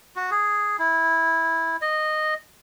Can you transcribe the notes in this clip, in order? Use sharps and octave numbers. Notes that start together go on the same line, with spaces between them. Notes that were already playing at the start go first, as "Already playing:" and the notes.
F#4
G#4
E4
D#5